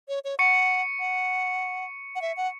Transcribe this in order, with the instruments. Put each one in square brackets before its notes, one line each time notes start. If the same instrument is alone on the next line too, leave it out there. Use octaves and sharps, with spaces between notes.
[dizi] C#5
C#5
[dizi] F#5 [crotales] C#6 C#7
[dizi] F#5
F#5
E5
F#5